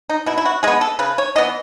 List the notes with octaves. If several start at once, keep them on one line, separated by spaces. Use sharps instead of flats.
D#4
B2 E4
E4
F#4
G#3 B3 G#4
A4
C#3 B4
C#5
E3 B3 D#5